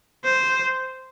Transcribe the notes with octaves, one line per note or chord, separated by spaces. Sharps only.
C5